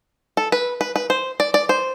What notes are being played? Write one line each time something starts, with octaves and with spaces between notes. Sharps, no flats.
A4
B4
B4
B4
C5
D5
D5
C5